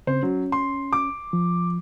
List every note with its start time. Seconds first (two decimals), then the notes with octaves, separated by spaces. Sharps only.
0.07 C#3 C4 C5
0.23 F#3 C#4
0.52 C6
0.93 D6
1.33 F3